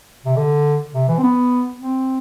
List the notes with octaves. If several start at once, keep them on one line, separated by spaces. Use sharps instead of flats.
C3
D3
C3
E3
C4
B3
C4